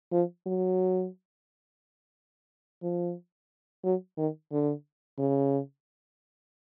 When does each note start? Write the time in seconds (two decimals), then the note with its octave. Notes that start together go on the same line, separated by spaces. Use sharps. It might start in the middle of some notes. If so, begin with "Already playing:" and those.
0.12 F3
0.46 F#3
2.83 F3
3.84 F#3
4.18 D#3
4.52 D3
5.18 C#3